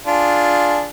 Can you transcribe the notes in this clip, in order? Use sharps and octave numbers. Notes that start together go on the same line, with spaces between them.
D4 F4 G#4